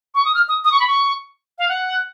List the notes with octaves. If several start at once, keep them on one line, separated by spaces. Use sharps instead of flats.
C#6
D#6
F6
D#6
D#6
C#6
B5
C#6
F5
F#5